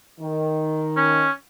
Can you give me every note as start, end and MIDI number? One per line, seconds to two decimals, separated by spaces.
0.20 1.25 51
0.97 1.31 61